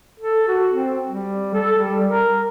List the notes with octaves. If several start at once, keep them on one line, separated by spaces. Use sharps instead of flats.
A4
F#4
C4
G3
A4
G3
A#4